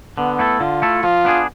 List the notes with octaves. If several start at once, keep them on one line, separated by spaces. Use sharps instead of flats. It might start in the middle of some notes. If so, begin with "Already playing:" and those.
D3 B3
A3 E4 A4
D3 F4
A3 E4 A4
F3 F4
B3 D4 G#4